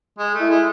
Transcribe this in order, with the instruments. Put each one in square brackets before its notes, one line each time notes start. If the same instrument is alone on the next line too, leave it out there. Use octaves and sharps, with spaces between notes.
[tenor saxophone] G#3
A3
[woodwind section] E4
[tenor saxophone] G#3